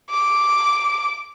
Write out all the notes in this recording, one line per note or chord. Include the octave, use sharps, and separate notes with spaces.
D6